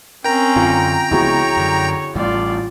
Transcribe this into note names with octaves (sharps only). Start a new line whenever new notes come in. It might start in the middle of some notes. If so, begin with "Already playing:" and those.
C4 C#4 A#4 G5 A#5
F#2 D3 F4
C#2 F3 B3 E4 F#4 G#4 C#5
F#2 D3
A1 A2 G3 F4 D5